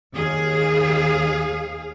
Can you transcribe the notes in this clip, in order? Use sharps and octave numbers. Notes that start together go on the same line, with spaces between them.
D#2 G#4 F5